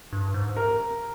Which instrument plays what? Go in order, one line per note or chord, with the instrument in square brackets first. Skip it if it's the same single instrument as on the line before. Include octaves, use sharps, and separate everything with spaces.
[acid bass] G2
G#2
[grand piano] A#4